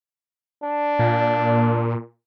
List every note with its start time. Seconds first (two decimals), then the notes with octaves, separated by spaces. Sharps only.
0.63 D4
0.99 A#2